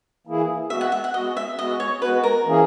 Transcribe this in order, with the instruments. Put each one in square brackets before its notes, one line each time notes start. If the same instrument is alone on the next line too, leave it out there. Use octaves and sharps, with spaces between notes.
[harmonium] E3 A#3 E4 G#4
[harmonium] G#3 B3 F#4 [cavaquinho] E5
[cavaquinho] F#5
E5
F#5
[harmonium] G#3 B3 F#4 [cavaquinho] D#5
[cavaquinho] E5
[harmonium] G#3 B3 F#4 [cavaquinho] D#5
[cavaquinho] C#5
[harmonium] G#3 B3 F#4 [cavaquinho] B4
[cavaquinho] A#4
[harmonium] E3 A#3 C#4 G#4